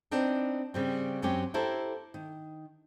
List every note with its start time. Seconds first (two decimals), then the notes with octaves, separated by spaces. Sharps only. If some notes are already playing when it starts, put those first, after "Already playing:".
0.11 B3 C4 D4 D#4
0.74 C#3 G3 C4
1.22 F#2 F#3 C4 C#4 G4
1.54 E4 G4 A4 A#4 C5
2.14 D#3